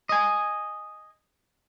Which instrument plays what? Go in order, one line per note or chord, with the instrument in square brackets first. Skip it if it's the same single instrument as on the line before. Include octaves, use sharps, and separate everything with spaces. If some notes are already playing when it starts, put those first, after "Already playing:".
[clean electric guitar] D#5 G#5